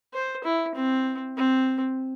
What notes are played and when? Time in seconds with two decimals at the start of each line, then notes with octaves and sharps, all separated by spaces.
0.14 C5
0.44 E4
0.75 C4
1.37 C4